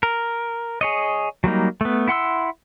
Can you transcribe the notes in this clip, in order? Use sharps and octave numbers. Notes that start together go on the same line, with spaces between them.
A#4
G#4 C#5 D#5
F#3 G3 A#3 D#4
A3 B3
E4 F#5 C6 E6